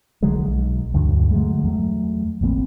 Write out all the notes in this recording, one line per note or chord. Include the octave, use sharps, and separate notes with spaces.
B1 D3 F#3 G#3
B1
D2 G2 D3 F#3
D3 F#3 G#3 A3
E2 F#3 A3
E1 A1 A#3 C4